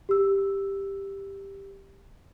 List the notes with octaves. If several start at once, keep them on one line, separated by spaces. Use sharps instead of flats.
G4 E6